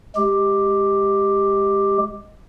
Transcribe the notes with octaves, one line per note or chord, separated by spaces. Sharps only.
G#3 G4